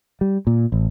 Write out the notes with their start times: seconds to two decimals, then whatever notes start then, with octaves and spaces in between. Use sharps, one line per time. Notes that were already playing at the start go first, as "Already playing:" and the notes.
0.21 G3
0.47 A#2
0.72 A1